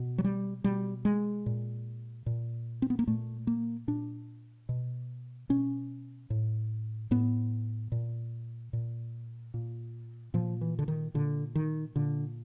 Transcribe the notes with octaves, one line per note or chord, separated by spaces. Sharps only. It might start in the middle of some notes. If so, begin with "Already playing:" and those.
Already playing: B2
F#3
G3
B2 G3
G#3
A#2
A#2
C4
B3
A#3
A#2 A3
A#3
A#2 D4
B2
B2 C#4
A2
A2 B3
A#2
A#2
A#2
A#2 F3
E3
D3
D#3
A#2 D3
D#3
A#2 D3